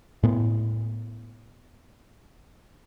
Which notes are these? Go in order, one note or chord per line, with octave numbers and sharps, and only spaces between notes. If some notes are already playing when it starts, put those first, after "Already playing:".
A2 B3